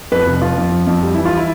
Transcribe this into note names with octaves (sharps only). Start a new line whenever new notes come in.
F2 B4
F1
F3 F4
F2
F3
F2
G3
E3 E4
F4
E4